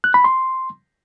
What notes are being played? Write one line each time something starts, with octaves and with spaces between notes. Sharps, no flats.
F#6
B5
C6